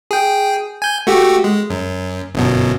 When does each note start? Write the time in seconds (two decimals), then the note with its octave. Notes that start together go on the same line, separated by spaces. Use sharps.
0.11 G#4 G5
0.82 G#5 G6
1.07 A3 F#4 G4
1.44 G#3
1.70 F#2
2.35 G1 F#2 B2